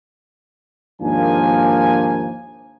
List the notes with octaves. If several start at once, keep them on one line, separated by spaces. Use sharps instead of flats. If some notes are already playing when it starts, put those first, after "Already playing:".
D#2 G#2 F3 A#3 D4 G#5